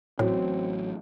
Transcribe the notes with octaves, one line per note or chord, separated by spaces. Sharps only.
A1 A2 F#3 C4 F#4 C#5